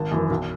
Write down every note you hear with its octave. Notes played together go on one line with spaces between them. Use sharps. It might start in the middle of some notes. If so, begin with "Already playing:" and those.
Already playing: G#1 A5
F#2 E3
B1